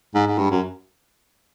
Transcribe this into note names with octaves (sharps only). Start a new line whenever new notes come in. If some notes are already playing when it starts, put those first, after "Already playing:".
G#2
G#2
G2
F#2